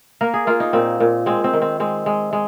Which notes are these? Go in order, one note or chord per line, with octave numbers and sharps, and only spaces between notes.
A#3 A#4
G#4
A#3 F4
D#4
A#2 C4
A#2
G#3 C4
C4
D#3
C4
G#3 C4
G#3
G#3